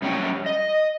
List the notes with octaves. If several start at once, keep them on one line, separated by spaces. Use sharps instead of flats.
F#2 G3 C#5 G5
D#5